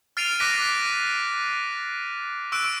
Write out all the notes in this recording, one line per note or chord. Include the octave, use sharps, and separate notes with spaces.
F6 A6 C7 D7 D#7 F7
D6 F#6 A#6 B6 D7 D#7
C#6 E6 F#6 D7